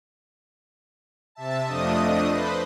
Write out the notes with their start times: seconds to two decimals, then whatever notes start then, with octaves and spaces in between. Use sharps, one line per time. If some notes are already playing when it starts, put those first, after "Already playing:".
1.35 C3 E5 A5
1.66 F2 F3 A3 D4 D#5 D#6
2.28 B4 C5